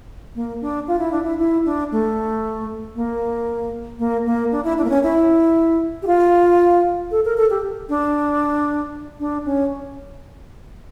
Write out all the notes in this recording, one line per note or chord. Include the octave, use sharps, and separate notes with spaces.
A#3
D4
F4
E4
D4
E4
E4
D4
A3
A#3
A#3
A#3
D4
E4
D4
A#3
C#4
E4
G4
F4
A4
A#4
A4
G4
D4
D4
C#4